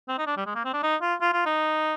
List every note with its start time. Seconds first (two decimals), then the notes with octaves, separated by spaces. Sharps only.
0.08 C4
0.18 D#4
0.26 D4
0.37 G3
0.46 G#3
0.55 A#3
0.65 C4
0.73 D4
0.83 D#4
1.01 F4
1.21 F4
1.33 F4
1.46 D#4